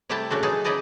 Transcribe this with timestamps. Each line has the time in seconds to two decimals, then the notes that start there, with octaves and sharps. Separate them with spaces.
0.09 C3 G3 A3 E4 G5 A5
0.30 A#2 C#3 A3 D4 F#4
0.43 E3 F#3 D#4 G#4 A5
0.64 C#3 D#4 E4 D5 D#5 A5